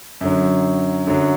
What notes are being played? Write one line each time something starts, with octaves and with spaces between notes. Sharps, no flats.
F#2 D3 F#3
F#2 D3 F#3